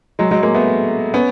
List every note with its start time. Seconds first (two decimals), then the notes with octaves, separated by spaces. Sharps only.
0.19 F#3 G#3
0.31 F#3 G#3
0.43 G#3 A#3
0.55 A3 B3
1.14 B3 C#4